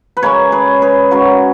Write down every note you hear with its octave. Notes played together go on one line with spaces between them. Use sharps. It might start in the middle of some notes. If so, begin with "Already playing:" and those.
B4
C#3 G#3 C#4 A#4 C#5
G#4 B4
G#4 B4
C#3 G#3 C#4 F#4 A#4